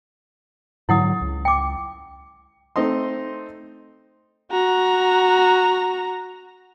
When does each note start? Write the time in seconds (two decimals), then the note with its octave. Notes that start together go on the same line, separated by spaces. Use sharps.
0.89 G#2 D3 F#3 E4 F#5 D#6
1.21 C#2
1.45 G5 D6
2.76 A3 C4 D#4 D#5 C6
4.51 F#4 A#5